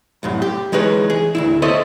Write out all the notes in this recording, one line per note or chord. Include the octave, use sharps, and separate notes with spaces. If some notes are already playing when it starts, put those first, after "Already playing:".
C2 F#2 A2
G4
E3 G#3 D#4 B4 C#5
G#4
D2 C3 E4
A4 C5 C#5 D#5 E5